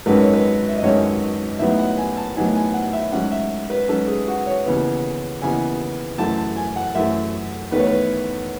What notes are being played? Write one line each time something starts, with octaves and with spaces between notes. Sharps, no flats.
G#1 F#2 D#3 G#3 C#4 B4
C#5
B4
E5
D#5
G#1 F#2 D#3 G#3 C#4 C#5
A1 A2 F#3 B3 D#4 E5
F#5
G#5
A5
A1 A2 F#3 B3 D#4 G#5
G#5
F#5
E5
G#2 F#3 C#4 F#5
E5
B4
G#2 F#3 C#4 A4
G#4
F#4
C#5
D#2 C#3 E3 B3
D#2 C#3 E3 B3 G#5
F#2 E3 A3 A5
A5
G#5
F#5
F#2 E3 A3 E5
E2 D#3 A3 B4
C#5
B4